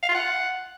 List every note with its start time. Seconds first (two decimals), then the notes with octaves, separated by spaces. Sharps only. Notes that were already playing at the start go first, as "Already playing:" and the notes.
0.03 F5
0.09 F4
0.15 F#5